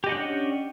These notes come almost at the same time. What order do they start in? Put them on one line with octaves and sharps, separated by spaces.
G4 D#5 F#5 D4 C#4